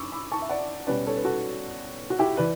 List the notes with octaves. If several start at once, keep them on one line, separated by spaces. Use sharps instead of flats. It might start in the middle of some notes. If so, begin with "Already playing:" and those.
Already playing: F#2 D4 B5 C#6 D6 E6
B5 D6
A5 C#6
E5
D5 F#5
B2 G3 C#4 B4 D5
A4 C#5
B4
F#4 A4
F#4
E4 G4
E3 B4 D5